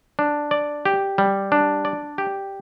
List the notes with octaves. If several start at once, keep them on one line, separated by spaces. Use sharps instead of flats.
D4
D5
G4
G3
D4
D5
G4